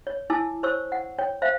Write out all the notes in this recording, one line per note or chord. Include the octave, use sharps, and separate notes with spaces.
C#5
E4 G#5 A5 D6 E6
C5 C#5 C#6 E6
F#5
C#5 G5
C5 E5 F5